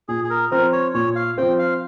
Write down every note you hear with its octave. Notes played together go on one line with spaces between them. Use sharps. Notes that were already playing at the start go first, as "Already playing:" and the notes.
A#2 G#4
G#4
A#4
F3 C4 A#4
C#5
A#2 C#5
F5
F3 C4 G5
F5